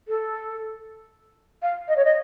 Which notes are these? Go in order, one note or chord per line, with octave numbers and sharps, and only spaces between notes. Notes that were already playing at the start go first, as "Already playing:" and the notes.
A4
F5
D#5
C#5
D#5